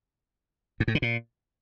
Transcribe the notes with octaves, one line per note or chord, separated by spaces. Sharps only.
G#2
A2
D3
A#2